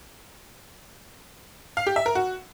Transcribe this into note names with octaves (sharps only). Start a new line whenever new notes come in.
F5
G4
E5
A#4
F#4